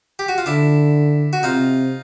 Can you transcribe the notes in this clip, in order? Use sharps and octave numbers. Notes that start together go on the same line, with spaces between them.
G4
F#4
F4
D3 D4 E4
F#4
C3 D#4 F4